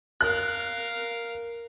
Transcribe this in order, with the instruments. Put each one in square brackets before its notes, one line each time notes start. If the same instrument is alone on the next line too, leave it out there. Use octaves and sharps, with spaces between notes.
[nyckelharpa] A#4 F5 [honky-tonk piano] F#6